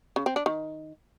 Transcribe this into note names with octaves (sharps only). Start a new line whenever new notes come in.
C#3
C4
D4
D#3